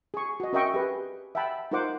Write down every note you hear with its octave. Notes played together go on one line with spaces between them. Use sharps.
G#4 C#6
F#4 D#5
C#4 A#4 D#5 E5 G5 C#6
G4 G#4 B4
E5 F#5 G5 A5 B5
D#4 F4 A#4 C5 F#5 D6